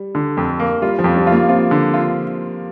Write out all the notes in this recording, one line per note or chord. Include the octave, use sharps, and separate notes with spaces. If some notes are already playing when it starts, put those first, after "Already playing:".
Already playing: G3
D3
F2
A#3
G3 F4
F3
F2
G3
F4
A#3
C4 F4
D3
F4